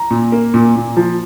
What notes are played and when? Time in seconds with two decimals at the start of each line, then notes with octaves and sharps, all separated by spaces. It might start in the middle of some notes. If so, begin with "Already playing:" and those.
Already playing: A#5
0.11 A#2
0.32 A#3
0.54 A#2
0.76 A#2
0.97 F3